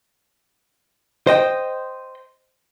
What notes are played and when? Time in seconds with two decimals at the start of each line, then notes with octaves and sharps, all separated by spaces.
1.27 C5 D#5 G5